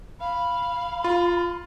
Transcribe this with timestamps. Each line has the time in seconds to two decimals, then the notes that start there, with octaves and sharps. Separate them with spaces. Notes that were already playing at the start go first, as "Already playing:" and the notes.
0.20 F5 B5
1.04 F4